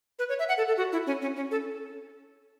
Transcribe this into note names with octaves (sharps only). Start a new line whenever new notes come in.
B4
C#5
E5
F#5
A4
A4
F#4
E4
C#4
C#4
C#4
A4